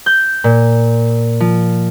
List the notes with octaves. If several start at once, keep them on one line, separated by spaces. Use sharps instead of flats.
G6
A#2
F3